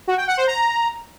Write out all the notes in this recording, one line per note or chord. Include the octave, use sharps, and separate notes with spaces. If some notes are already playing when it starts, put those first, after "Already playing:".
F#4
G5
F#5
C5
A#5